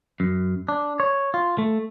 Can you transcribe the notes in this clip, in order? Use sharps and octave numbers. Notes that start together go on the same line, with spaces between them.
F#2
D4
C#5
F4
A3